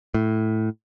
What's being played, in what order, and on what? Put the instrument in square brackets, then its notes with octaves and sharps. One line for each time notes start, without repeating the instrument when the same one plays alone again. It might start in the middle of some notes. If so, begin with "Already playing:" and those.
[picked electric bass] A2